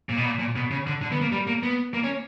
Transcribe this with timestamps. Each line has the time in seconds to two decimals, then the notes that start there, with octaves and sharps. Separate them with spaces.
0.09 A#2
0.17 B2
0.25 A#2
0.39 A#2
0.56 B2
0.71 C#3
0.87 D3
1.02 D3
1.12 B3
1.21 A#3
1.32 G3
1.47 A#3
1.63 B3
1.94 A#3
2.04 C#4